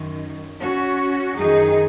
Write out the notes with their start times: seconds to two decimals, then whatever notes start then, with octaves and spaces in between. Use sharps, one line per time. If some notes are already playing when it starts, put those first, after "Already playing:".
Already playing: F#2 D#3 F#3
0.61 C#4 F#4
1.37 F#2 D#3 F#3 D#4 G#4